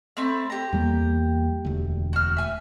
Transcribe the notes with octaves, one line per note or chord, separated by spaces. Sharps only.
A3 C4 B5
G4 A#5
E2 G3 A#3
E1 D2
F#4 F6
E5 G#5